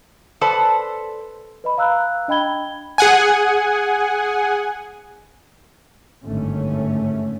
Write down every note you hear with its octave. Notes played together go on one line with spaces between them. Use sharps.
A4 B4 C5 D5 A5
B4 D#5 B5
F5 A#5 E6 F#6
D4 D#5 G5 B5 G#6 G7
G#4 F#5 G#5
G#1 G2 D3 A3 C#4